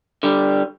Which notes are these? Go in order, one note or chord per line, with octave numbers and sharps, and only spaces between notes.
D3 G3